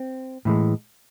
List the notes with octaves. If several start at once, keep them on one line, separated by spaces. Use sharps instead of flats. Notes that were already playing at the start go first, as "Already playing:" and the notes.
Already playing: C4
A2 E3 G#3